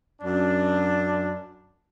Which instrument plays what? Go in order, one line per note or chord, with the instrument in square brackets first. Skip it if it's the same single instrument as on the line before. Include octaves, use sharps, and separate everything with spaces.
[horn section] F#2 D4